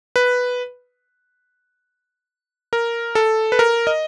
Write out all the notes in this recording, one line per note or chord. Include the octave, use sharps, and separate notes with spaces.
B4
A#4
A4
B4
A#4
D#5